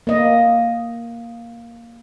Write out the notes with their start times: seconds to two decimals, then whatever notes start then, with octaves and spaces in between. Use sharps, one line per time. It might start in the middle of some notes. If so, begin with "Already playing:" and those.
0.07 A#3 D#5